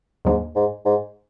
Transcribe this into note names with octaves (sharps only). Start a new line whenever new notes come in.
D#2 G#2 D3 F#3 A#3 D4
G#2
G#2